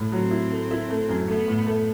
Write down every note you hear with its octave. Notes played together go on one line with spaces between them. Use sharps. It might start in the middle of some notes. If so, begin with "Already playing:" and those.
Already playing: A2
F#3 C4
E4
A3
E4
A3
F#2
A3 B3
A2
A3